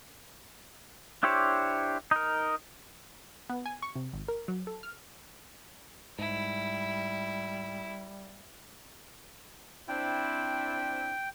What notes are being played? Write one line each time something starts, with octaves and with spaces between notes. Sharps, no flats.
D4 E4 G4 C5 C#5
D#4 A#4
B3
G#5
C#6
C3
G#1
A#4
F#3
A4
F6
G#2 G3 E4
C4 D4 E4 G5